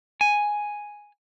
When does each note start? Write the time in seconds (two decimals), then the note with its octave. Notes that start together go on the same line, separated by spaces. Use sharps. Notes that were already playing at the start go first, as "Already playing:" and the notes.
0.21 G#5